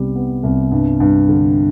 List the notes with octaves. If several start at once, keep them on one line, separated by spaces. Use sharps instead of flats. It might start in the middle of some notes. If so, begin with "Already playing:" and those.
Already playing: C2 C3 G3 B3
B3
C2
G2
G2
D3